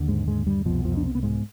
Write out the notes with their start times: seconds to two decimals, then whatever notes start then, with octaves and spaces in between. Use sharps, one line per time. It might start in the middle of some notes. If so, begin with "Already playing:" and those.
Already playing: D#2 D3
0.08 G#2 G#3
0.27 G#2 G#3
0.47 G2 G3
0.65 C2 F2 B2 F3
0.85 F2 F3
0.97 D4
1.06 C4
1.15 B3
1.23 G#2 G#3